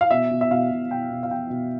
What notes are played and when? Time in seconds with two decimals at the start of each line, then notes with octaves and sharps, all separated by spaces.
0.01 F5
0.11 B2 E5
0.30 B2
0.41 E5
0.51 B2 F5
0.71 B2
0.90 B2 G5
1.11 B2
1.23 F5
1.30 B2 G5
1.50 B2